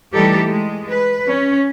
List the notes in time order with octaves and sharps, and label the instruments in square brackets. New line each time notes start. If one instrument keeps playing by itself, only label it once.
[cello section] E3 G3 A3 D#4 G4 A4
G#3
B4
C#4